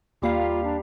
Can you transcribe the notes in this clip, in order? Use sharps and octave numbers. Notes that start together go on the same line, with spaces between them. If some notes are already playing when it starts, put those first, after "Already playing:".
D#2 G3 A#3 F4 G4 F5 C6
D4